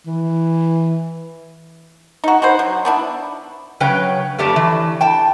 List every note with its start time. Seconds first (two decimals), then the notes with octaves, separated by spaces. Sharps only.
0.07 E3
2.24 D#4 F#4
2.42 D#4 F#4 B4 C5
2.59 F#3
2.85 B3 D4 E4
3.80 C#3 F#3 B4 C#5 G5
4.39 F2 A3 G4 D5 A5
4.56 E3
5.01 G5 A5